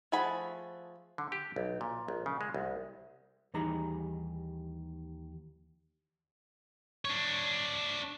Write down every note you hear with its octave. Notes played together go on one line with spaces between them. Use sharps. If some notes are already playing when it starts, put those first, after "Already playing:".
F3 A3 G#4 F#5 B5
D3
G4
B1
A#2
A#1
C#3
G#3
C2
D#2 E3 G3 D#4 G#4 A#5
D4 C#5